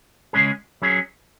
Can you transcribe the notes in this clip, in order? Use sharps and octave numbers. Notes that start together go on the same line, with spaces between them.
C#3 G#3 C#4 G#4
F#3 C#4 G#4